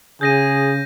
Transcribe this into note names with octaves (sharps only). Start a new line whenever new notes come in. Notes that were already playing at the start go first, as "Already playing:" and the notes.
C#3 G#4 G6 A#6 D#7